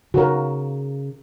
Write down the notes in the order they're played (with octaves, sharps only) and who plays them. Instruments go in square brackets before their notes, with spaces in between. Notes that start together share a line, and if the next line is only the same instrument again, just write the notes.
[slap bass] C#3 [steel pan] F#4 A#4